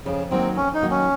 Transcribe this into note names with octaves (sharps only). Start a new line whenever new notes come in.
F2 C#3
D#3 F#3 A#3 C4
F2 C#4
D#4
D#3 F#3 A#3
C#4